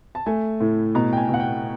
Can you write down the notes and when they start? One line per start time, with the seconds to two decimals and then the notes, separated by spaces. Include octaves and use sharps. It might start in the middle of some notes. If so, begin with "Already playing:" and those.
0.15 A5
0.26 A3 G#5
0.60 A2
0.95 B2 A#5
1.13 G5
1.17 G#5
1.28 B2
1.34 F#5
1.40 G5